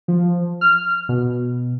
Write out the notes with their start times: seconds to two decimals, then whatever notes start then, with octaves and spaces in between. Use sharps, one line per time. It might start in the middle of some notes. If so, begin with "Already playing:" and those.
0.08 F3
0.61 F6
1.09 B2